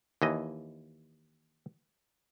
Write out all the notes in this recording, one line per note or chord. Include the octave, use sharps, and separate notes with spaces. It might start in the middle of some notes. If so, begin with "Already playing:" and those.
D#2 E3 D#5